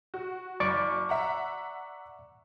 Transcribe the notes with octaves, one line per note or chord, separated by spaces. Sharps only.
F#4
F#1 D5 C#6 D6
E5 F#5 A#5